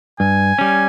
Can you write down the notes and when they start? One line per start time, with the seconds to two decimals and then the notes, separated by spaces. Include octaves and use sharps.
0.20 G2 G#5
0.59 G3 C#4